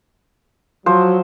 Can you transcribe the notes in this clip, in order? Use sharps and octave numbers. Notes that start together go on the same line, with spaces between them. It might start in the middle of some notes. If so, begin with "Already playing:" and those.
F3 F#3 C5